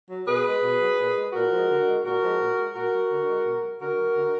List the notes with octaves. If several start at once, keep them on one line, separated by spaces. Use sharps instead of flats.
F#3
B2 G#4 B4
G#3
B2
F#3
A#2
G#3
A#2 F#4 A#4
F3 G#3
D3
G#3
A#2 F#4 A#4
F3 G#3
A#2
G#3
A#2 F#4 A#4
F#3
D3
G#3
B2
F#3
D3 F#4 A#4
F#3
D3